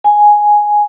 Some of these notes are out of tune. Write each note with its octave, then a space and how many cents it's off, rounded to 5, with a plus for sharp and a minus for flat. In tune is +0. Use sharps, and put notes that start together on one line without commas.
G#5 +0